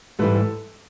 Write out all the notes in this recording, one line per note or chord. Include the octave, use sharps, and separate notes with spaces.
G#2 E3 G3 A4 B4
A4